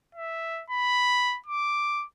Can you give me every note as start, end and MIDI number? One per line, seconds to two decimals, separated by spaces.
0.15 0.63 76
0.70 1.38 83
1.46 2.05 86